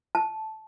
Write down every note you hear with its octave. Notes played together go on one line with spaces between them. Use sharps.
A5